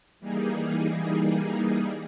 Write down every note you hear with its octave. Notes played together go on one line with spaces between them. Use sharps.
E3 G3 A#3 D#4 G#4